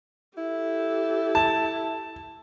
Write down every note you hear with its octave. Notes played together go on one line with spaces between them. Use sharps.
E4 G4 A4
A5